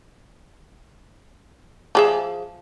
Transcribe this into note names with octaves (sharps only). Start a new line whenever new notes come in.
F3 G#4 E5